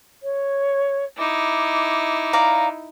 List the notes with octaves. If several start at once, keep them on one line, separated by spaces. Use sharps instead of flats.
C#5
D#4 E4 D6
D5 F5 A#5